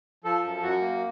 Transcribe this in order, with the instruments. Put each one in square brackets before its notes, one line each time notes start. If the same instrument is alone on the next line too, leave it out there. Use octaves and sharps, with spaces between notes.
[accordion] F3 A4
F#2
F#2 F#4
A#3